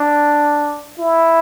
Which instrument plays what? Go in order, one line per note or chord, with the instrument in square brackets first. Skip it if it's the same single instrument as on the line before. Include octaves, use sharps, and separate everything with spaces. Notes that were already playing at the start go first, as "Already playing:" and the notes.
Already playing: [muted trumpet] D4
E4